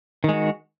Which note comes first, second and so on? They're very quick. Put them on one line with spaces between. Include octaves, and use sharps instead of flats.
D#3 G#3 F#4